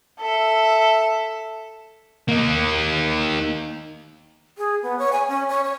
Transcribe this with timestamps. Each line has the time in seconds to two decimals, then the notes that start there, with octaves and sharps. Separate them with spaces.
0.21 A4 E5
2.29 A#3 D#4
4.58 G#4
4.83 B3
4.99 C#5
5.12 G#5
5.28 C#4
5.49 C#5
5.64 C#5